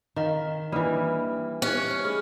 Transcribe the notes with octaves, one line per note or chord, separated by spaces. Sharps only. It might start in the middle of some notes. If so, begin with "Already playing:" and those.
D#3 D#5 F5 A#5
E3 G3 A#3 D4 F6
C#4 D#4 G4 F#6
A3 G#4 F6